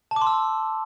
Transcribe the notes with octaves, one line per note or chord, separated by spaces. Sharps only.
A5
D6
C6
E6